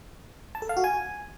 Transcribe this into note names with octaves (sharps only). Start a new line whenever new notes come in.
A5
A4
F5
F#4
G#5